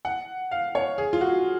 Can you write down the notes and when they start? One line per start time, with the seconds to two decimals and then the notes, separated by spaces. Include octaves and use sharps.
0.05 F#5
0.51 F5
0.75 C#5
0.98 G#4
1.13 F4
1.21 F#4